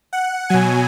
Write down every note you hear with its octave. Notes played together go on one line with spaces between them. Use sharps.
F#5
B2 F#3 G#5